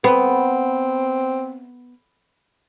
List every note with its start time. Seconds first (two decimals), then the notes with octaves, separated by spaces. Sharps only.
0.04 B3 C4